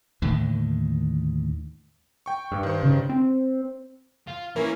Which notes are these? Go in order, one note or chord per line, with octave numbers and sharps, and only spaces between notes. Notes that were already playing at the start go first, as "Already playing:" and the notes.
D#2 A2 D3 D#3
G5 C#6
G2
D#3 C5
C#3
C4
F4
E3 A#3 C#4 E4 A#4